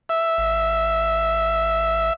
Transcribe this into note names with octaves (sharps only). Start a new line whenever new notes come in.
E5
G#1